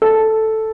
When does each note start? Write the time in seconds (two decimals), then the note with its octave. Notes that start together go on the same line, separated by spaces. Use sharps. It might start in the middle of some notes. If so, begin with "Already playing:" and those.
0.02 A4